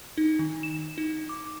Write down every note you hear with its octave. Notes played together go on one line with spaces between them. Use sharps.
D#4
D#3
E7
D#4
D6